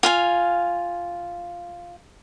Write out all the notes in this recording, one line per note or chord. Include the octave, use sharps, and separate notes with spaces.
F4 F5 G#5